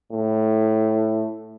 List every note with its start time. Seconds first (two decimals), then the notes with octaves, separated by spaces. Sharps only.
0.12 A2